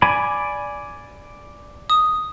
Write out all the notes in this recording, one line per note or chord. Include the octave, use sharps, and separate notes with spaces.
D5 G#5 B5
D#6